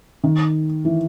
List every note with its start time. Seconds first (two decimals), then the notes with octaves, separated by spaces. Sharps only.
0.24 D#3
0.85 E3